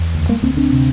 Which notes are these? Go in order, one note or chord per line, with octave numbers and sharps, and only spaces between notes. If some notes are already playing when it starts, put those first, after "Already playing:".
Already playing: E2
D2
G#3 A#3
D2 A#3 C4
C4 D4
C3